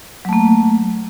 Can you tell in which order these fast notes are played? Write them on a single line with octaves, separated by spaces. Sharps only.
F#3 A3 A#3